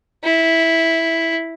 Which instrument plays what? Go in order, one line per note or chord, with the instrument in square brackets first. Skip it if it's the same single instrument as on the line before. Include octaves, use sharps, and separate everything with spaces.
[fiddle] E4